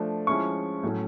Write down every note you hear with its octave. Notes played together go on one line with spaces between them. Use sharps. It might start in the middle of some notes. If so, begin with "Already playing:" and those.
Already playing: F3 A3 D4
F3 G#3 C#4 E4 C#6
A2 F#3 A3 C#4